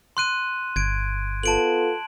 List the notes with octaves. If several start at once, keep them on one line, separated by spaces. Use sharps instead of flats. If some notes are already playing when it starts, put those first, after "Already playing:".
C6 F#6 D#7
G1 G#6 D7
B3 F4 A4 A5 D7 F#7